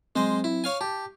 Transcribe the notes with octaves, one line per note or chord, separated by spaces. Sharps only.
F#3 G#3 C4 C5 D#5
E4
C#5 F5 G#5
G4 A5